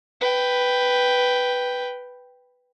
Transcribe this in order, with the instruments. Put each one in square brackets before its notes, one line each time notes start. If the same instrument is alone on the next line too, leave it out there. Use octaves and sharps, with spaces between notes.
[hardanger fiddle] B4 G5